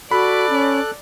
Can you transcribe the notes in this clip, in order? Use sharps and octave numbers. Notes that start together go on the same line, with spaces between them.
F#4 A4 D5 B5 F#6
C#4